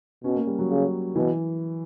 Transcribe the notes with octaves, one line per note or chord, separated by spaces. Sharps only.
B2 C#4
A#3
G3
F#3
C#3
B2 E3